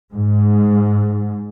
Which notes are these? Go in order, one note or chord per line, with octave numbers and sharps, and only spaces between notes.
G#2